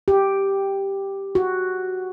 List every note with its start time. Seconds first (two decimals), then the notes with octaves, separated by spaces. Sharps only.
0.08 G4
1.35 F#4